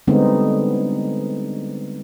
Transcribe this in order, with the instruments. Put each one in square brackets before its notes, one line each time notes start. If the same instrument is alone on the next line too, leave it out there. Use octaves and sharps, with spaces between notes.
[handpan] D3 G3 G#3 B3 C4 D#4